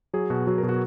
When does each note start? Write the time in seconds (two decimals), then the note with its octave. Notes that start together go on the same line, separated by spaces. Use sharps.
0.14 F#3 G#4
0.30 B2 F#4
0.47 F#3 F#4
0.58 B2 A#4
0.69 F#4